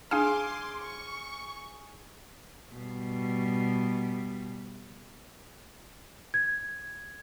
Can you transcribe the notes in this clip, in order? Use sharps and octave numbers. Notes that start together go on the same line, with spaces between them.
D4 G#4 F5 G#5 C6 D6 F6
C#6
B2 G3
G#6